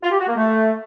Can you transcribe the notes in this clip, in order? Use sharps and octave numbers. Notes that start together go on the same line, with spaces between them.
F4
G4
F#4
A#3
A3